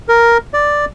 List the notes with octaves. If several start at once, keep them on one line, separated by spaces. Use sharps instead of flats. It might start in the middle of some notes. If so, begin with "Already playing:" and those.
A#4
D5